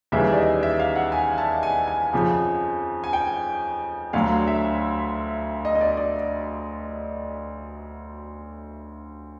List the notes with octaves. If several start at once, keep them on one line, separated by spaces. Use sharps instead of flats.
D#2 C#3 E3 G3 E5
D5
D#5
E5
F5
F#5
G#5
A5
G#5
G#5
F2 C#3 F3
G#5
G5
D2 D3 F#3 F5
F5
E5
D#5
D#5
D5
D5